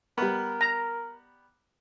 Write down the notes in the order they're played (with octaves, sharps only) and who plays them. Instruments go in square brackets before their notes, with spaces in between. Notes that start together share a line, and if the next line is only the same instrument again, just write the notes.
[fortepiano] G3 B3 [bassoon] A#4
[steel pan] A#5